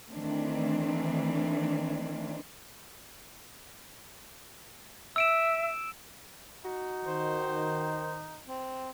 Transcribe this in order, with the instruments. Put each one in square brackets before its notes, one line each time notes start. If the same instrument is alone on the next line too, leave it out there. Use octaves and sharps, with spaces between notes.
[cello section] D#3 E3 A3 C4 D4
[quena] E5 [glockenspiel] E6 D7 E7
[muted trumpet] D#4 [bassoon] F#4
[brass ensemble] D#3 [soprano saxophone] C5
[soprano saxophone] C4